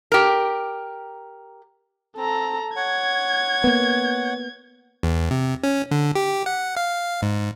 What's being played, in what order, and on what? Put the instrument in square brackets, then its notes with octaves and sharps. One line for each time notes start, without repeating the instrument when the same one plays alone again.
[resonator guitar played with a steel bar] G4 A#4
[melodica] C4 [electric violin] A4 A#5
[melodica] C#5 F#5 [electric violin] G#6
[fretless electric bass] A#3 B3
[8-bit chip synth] E2
C3
C#4
D3
G4
F#5
F5
G#2